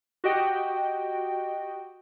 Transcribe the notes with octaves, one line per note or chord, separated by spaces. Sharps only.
F#4 G4 D#5 G5